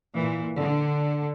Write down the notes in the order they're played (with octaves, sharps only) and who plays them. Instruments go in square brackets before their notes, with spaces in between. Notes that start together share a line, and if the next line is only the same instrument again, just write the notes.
[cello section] A#2 E3
D3